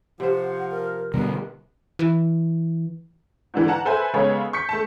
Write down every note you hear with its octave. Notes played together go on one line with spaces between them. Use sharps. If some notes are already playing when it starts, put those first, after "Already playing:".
C3 F3 C5 F#5
A#4
B2 D3 G3 B3 A#4
E3
G#2 D3 E3
F#5 A5 A#5
A4 B4 C5 E5 G#5 B5
C#3 G#3 B3 G#4 A4 C#5
C#6 G6 B6 C#7
A3 A5